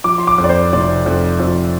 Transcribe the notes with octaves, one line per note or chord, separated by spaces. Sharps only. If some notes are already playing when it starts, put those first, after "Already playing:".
F3 D6
C6
D6
F2
D5
C5
F1 D5
F2
F2